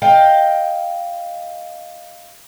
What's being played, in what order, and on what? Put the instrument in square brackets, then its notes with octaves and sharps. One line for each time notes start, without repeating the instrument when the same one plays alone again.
[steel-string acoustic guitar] D#5 F5 G5